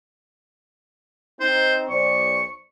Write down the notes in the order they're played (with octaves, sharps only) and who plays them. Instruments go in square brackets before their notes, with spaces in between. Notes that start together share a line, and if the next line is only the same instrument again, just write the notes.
[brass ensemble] C4 D#4 [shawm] C5
[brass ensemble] B1 C5 D5 [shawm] C#6